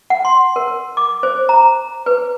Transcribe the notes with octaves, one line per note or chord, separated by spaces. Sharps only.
F#5
C6
A#4
D6
C5
A#5
B4